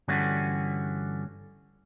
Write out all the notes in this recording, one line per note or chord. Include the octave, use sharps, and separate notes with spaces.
G2 D3 E3 A3 C#4 F#4